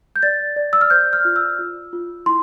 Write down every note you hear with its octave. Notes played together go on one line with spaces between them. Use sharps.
G6
D5 A6
D5
E6
F6
C5 G6
F6
F4
E6
F4
F4
E4 C6